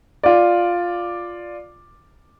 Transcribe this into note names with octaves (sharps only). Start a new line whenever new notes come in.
F4 D5